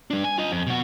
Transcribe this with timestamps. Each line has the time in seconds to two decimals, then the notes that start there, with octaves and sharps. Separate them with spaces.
0.10 G3 D4
0.24 G#5
0.38 F4 D#5
0.52 F2
0.67 B2 F#4